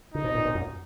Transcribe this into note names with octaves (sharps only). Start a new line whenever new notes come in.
D3 D#4
B2
A#2
A#2
F#2